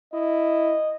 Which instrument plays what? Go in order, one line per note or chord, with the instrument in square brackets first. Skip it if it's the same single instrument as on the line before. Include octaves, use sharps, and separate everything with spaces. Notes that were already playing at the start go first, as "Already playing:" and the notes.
[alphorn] E4 [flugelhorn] D#5